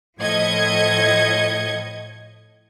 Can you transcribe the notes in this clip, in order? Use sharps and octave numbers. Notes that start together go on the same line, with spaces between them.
A2 F3 D#5 G#6 C#7